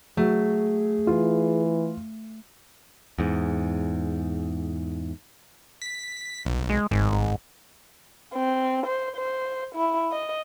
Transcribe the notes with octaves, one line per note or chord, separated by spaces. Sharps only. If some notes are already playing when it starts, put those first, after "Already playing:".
F#3 A3 G#4
E3 F4
E2 G#2
B6
B1
G#3
G#1 G#2
C4
C5
C5
E4
D#5